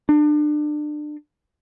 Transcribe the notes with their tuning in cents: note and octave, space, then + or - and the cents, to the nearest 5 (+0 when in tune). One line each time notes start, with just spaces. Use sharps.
D4 +30